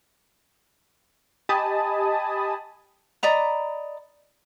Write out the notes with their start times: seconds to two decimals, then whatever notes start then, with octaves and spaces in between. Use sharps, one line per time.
1.49 G4 D#5 G#5 A5 B5 D#6
3.23 D5 D#5 A#5 B5